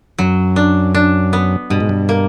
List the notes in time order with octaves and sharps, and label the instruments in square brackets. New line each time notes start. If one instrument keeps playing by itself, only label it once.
[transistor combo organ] F#2 [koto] F#3
[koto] D4
D4
B3
[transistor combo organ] G2 [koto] B2
[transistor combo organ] G#2
G2
[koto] A#3